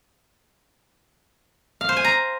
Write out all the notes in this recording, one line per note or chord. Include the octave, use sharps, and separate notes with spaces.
F5
C5
G#5
A#5